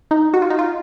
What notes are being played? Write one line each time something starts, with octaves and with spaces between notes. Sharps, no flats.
D#4
F#4
F4
D#4
F4